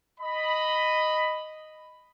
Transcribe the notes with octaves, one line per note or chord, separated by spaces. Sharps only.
D#5 B5